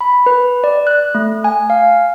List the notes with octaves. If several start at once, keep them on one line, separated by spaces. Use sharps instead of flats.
B5
B4
D5
F#6
A3
G#5
F5